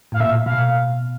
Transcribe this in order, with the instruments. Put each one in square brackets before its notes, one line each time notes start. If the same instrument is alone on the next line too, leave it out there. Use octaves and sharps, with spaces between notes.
[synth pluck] A2 [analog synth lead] F5
[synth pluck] A#2 [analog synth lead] E5
[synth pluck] B2 [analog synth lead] F5